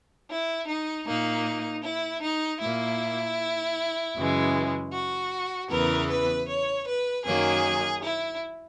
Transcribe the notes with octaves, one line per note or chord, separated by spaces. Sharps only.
E4
D#4
A#2 A#3 D#4
E4
D#4
A#2 A#3 E4
F#2 C#3 E3 G#3
F#4
E2 C#3 E3 B3 A#4
B4
C#5
B4
F#2 D#3 F#3 A#3 G#4
E4